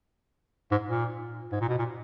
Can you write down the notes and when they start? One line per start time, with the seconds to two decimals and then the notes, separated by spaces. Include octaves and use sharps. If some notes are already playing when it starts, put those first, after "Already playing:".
0.71 G#2
0.89 A#2
1.52 G#2
1.61 A#2
1.68 B2
1.78 A#2